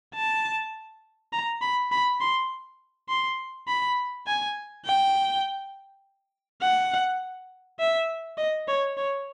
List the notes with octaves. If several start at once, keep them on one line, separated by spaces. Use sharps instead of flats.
A5
A#5
B5
B5
C6
C6
B5
G#5
G5
F#5
E5
D#5
C#5
C#5